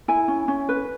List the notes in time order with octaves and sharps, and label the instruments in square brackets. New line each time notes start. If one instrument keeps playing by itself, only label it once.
[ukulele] E4 G#5
C#4
C#4
B4